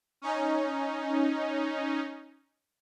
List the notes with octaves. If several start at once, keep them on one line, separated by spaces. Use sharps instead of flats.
C#4 D#4